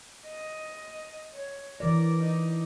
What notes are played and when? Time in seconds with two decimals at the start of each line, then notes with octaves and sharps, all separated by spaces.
0.26 D#5
1.34 C#5
1.80 E3 A#4 D5
2.22 D#4